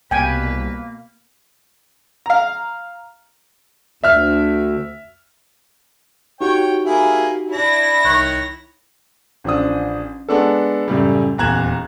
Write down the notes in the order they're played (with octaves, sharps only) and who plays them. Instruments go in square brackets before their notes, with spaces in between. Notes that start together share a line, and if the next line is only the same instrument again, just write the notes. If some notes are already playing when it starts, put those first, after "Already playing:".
[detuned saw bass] C2 [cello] B2 B4 [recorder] A#3 [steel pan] G5 G#5
[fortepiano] F5 A#5
[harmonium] D2 [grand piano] E5 F6
[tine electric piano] D#4 F#4 G4 [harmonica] C#5 G5
[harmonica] A#3 E4 G#4
[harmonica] D4 [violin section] E4 A#6
[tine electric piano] C2 F#6 [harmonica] D#3 C#5
[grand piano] A1 F3 D4 D#6
G#3 B3 D4 A4
F#2 A2 C#3 G3
D#1 E2 A#5 F#6 G#6 E7